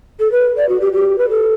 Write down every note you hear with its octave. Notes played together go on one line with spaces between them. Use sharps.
A4
B4
D5
F#4
G4
G4
B4
A4